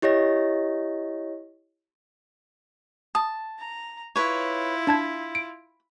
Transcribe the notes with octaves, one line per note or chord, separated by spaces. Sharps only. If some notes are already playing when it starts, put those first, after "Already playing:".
E4 G4 C#5 D#5 A#6
A5 D#6
A#5
E4 F4 B4 C#5
D4 A5 B5 G#6
D7